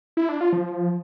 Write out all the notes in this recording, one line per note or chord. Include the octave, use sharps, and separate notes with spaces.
E4
D4
F4
F3